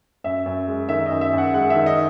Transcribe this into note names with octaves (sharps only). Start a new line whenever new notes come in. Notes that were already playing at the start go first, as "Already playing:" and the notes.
F#2 E5
F#2
G#3
D#3 E5
F#2 D#5
E5
F#2
F#5
G#3 F#5
E5
D#3
D#5